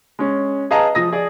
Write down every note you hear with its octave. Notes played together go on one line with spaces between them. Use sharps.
G#3 C#4
G#4 B4 D#5 F5 A5 A#5
F3 D#6 A#6
G#4 D5